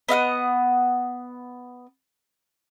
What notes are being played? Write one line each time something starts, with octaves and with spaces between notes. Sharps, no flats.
B3 D#5 F5 F#5